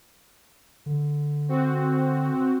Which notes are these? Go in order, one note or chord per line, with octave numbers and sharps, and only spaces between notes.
D3
C4 F#4